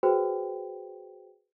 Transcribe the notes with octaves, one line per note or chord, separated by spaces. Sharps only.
F#4 G#4 B4 C5 G5